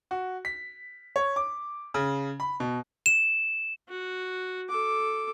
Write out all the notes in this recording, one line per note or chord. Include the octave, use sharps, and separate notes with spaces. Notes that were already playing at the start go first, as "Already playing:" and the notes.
F#4
B6
C#5
D6
C#3
B5
B2
E7
F#4
A4 D6